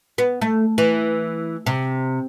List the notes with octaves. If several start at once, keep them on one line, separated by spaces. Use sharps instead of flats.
B3
A3
E3
C3